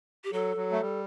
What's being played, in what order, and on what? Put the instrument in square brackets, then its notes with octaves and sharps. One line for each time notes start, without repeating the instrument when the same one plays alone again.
[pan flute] G4
[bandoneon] F#3 [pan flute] A4
[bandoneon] F#3
A3
G3